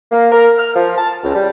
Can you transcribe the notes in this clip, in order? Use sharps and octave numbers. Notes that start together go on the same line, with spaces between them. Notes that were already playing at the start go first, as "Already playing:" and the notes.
A#3
A#4
F6
F3
A5
C#2
G3